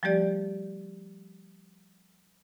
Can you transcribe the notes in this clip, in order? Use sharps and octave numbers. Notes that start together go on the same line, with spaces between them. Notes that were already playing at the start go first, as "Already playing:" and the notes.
F3 G3 A3 G4 D5